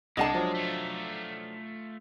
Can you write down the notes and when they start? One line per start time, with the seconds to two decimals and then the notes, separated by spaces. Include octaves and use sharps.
0.17 C2 G#3 D4 D#5 F#5 A5 C7
0.34 F3 F#3 D4
0.55 A3 F4